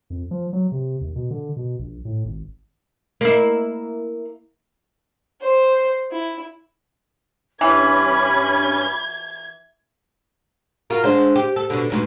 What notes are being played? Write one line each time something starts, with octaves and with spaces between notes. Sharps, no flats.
F2
F3
F#3
C3
D#2
B2
D3
B2
A#1
A2
G#1
A#3 E4
C5
E4
G2 E3 C#4 B5 D6 G#6
F4 F#4 A#4
D3 G#3 C5
G4
A4
B2 D3
D2 G#2 B2